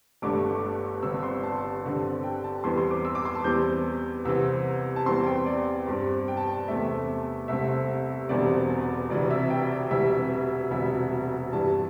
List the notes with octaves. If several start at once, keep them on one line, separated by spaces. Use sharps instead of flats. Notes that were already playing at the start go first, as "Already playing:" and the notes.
G1 G2 D3 A3 D6
G1 G2 G3 C4 E6
C6
A5
G2 D3 C4
G5
A5
E2 E3 G3 C4 C6
C6
D6
E6
D6
C6
A5
E2 E3 G3 C4 G6
C2 C3 E3 C4 E6
A5
E2 E3 G3 C4 C6
G5
D5
G2 G3 C4
G5
A5
G5
E2 C3 A3 C4 E5
C2 C3 A3 C4 E5
E1 E2 D3 G3 C4 D5
E1 D2 C3 E3 D5
E5
G5
E1 D2 C3 E3 G3 E5
E1 D2 C3 G3 E5
G2 E3 G3 A5